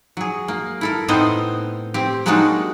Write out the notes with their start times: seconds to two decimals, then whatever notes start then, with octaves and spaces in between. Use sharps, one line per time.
0.17 F#3 G#4
0.48 A#3
0.81 E4 A4 A#4
1.08 A2 B3 C4 D#4 C5 D#5
1.94 C4 G4
2.26 F#3 G#3 A#3 D4 D#4 F#4